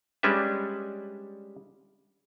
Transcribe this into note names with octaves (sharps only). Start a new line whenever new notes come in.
G3 G#3 C#4 D4 B4 E5